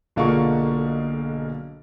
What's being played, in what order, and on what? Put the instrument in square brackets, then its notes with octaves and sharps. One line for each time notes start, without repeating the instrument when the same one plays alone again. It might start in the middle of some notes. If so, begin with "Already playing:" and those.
[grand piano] B1 D3 A#3 F4 G#4 C#6